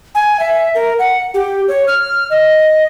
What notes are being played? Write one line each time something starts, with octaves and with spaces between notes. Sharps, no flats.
G#5
E5
A#4
F#5
G4
C#5
F6
D#5